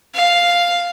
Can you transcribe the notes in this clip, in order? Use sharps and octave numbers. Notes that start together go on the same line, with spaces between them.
F5